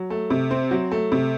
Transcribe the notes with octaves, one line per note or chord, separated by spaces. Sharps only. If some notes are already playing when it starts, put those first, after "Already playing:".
Already playing: F#3
A3
C3
C4
F#3
A3
C3